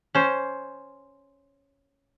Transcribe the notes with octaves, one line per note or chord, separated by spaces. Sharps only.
C#4 C5